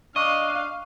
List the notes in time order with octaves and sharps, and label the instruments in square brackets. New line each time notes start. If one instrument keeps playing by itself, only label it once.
[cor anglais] D4 [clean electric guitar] D#5 [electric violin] F5 [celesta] C#6